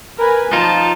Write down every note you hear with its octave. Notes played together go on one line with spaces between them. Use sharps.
A#4 B4 G#5
F3 D#4 F4 A5